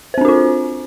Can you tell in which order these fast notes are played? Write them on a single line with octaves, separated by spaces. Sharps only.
C5 C4 D4 F#4 F4